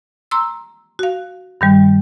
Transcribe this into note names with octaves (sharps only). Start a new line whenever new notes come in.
A#5 C6 E6
F#4 F5
G2 D#3 G3